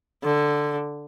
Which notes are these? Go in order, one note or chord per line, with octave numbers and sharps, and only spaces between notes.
D3